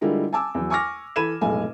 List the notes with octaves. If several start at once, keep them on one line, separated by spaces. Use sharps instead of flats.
D3 G3 G#3 E4 F4 A#4
G#5 A5 D6 E6
E2 F#3
G#5 C#6 D6 F6 A#6
E3 A4 B5 G#6 D#7 E7
F1 B1 A2 G#3 G#5